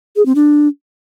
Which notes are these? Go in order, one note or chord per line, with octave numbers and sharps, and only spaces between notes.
G#4
C4
D4